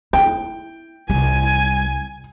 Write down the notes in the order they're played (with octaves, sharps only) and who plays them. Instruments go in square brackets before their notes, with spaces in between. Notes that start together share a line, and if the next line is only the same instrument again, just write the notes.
[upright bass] E4 [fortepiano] G5
[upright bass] C2 [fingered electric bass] G3 [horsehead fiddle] G#5